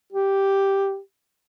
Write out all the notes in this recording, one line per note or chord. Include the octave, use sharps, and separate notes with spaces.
G4